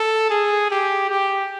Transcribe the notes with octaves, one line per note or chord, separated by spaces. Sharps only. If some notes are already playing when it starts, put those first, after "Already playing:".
Already playing: A4
G#4
G4
G4